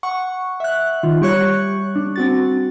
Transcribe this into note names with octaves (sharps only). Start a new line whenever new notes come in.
F#5 C#6
E5 F#6
D#3 F4
G3 G4 C#5 C#6 F#6
D4
C4 F#4 A6